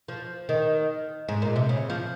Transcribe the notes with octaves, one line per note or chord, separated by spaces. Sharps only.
F3
D#3
G#2
A#2
C3
C#3
F3